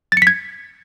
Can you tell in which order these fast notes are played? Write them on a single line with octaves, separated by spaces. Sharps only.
A6 C#7 B6 G#6